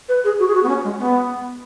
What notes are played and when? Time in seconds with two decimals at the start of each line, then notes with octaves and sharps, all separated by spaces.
0.09 B4
0.24 G#4
0.39 F#4
0.47 G#4
0.54 F#4
0.63 B3
0.68 C#4
0.84 G#3
0.99 B3